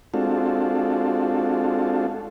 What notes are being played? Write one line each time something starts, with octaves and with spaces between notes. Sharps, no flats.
G#3 C4 D4 F4 F#4 A4